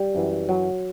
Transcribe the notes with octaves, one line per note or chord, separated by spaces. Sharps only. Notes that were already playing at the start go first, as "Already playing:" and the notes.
Already playing: G3
F#2 E3
F#3